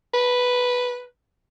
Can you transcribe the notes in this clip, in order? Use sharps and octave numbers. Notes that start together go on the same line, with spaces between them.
B4